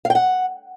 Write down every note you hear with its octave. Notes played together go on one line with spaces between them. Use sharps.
F5
G5
F#5